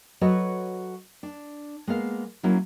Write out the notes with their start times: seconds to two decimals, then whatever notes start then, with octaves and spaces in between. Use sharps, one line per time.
0.21 F#3 F#4 A4 B4 C#5 D#5
1.23 D4
1.87 G#3 A#3 B3 F5
2.43 F#3 A#3 C#4 E4 F4